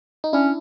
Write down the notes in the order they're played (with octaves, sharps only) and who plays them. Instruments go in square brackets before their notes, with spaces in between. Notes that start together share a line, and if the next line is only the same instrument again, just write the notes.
[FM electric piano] D#4
[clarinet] C#4 [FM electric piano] D4 E4